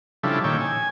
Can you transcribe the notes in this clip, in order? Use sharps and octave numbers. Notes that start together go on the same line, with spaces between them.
C#3 F3 G3 D4 E4 A4
A#2 D#3 C#5 G5 E6
G#5